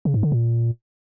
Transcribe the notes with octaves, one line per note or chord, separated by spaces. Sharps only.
C#3
G#2
D3
A#2